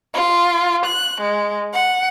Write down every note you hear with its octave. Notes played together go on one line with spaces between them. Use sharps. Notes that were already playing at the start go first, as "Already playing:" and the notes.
F4
F#6
G#3
F#5